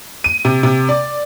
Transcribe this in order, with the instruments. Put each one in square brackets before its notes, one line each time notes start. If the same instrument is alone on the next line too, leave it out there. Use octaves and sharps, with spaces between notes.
[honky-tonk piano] D#7
C3
C3
D5